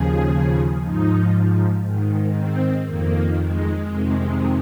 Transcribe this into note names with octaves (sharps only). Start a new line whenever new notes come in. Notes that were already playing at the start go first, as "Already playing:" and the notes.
Already playing: D#2 C#3 F3 G#4
G#2 F3 D#4
G#2 D#3
C4
F2 D#3 A#3
G#3
F2 C3 D#3